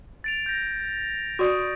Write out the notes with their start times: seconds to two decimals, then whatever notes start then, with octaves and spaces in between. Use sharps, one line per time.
0.24 A6 D7 F7
0.46 G6 A#6
1.39 F#4 D5 C#6 D#6 D7